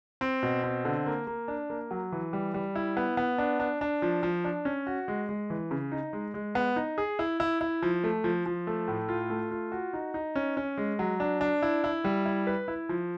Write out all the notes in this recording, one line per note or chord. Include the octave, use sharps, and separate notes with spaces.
C4
B2
C4
D3
A#3
A#3
D4
A#3
F#3
E3
G3
G3
E4
B3
B3
D4
D4
D4
F3
F3
D4
C#4
F#4
G#3
G#3
E3
C#3
D#4
G#3
G#3
B3
D#4
G#4
E4
E4
E4
F3
A3
F3
F3
A3
A2
F4
A3
F4
F#4
D#4
D#4
C#4
C#4
G#3
F#3
D4
D4
E4
E4
G3
E4
B4
E4
F3